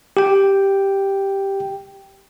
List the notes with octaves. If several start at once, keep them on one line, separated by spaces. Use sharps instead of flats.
G4 G5